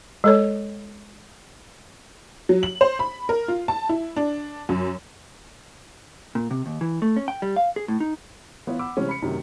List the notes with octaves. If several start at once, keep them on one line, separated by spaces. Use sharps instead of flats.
G#3 A4 C#5
F#3
F#7
C5
B5
A#4
F4
A5
E4
D4
F#2
A#2
C3
D#2
E3
A3
C#4
G5
G3
F5
G#4
A2
D#4
E3 B3 E4 F4 C#5
F#5 B5 D6 E6
C3 E3 G3 G#3 C#4 C5
B5 C#7
F#2 A2 C3 D#3